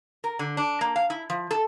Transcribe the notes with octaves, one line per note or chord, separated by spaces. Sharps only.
A#4
D3
D4
A#3
F5
E4
F3
A4